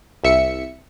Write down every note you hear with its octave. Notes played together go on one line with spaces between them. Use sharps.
C2 E5 C#7